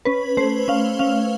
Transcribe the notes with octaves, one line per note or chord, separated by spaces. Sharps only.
C#4 B4
A3 C5
C#4 F5
C#4 F5